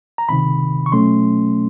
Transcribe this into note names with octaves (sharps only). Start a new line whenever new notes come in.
A#5
C#2 C3 D#3 B5
C#6
B2 F#3 A3 C#4 C6